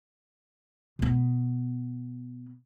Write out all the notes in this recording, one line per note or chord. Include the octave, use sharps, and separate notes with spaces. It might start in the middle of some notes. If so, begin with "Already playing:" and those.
B2 B3